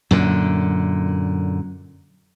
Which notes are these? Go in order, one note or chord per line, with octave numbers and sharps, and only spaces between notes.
F#2 A#2 D3